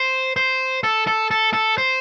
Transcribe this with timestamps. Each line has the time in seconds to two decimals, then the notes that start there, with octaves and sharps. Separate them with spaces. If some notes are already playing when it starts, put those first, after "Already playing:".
Already playing: C5
0.36 C5
0.83 A4
1.07 A4
1.31 A4
1.53 A4
1.78 C5